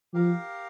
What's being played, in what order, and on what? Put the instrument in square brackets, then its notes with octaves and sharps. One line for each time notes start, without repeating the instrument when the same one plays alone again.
[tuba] F3 [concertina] G4 A#4 F5